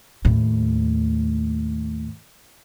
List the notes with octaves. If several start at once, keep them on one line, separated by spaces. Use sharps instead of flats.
D#2 A2